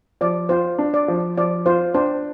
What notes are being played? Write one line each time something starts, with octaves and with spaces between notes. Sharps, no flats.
F3 D5
F4 C5
D4
D5
F3
F3 D5
F4 C5
D4 C5